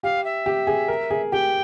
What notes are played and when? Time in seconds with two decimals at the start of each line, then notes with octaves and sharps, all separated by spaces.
0.03 G4 F5
0.25 E5
0.46 G4
0.67 G#4
0.88 A#4
1.11 G#4
1.32 G4 G5